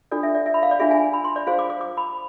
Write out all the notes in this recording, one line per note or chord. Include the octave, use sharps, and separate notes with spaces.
D4 F4 A4 D5
E5
D5
E5
B5
F5
D5
D4 F4 G#4 E5
G#5
B5
C6
D5
F4 G#4 C5 F5
D6
D6
D6
B5